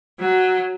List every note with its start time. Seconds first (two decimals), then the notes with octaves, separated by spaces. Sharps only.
0.20 F#3